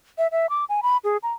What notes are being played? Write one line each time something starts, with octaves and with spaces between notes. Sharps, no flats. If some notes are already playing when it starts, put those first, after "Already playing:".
E5
E5
D6
G#5
B5
G#4
A#5